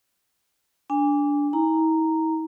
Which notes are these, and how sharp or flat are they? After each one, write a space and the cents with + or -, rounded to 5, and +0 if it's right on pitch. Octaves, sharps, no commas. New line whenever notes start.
D4 -15 G#5 -25
E4 -45 A#5 -5